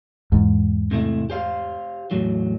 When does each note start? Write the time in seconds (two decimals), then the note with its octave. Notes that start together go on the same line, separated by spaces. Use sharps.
0.32 E2 G#2
0.91 C3 A3 E4
1.30 G4 C5 F5
2.11 E2 A2 F#3